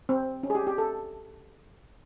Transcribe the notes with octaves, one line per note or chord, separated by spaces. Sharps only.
C4
C#4
G#4
G4
G4
A4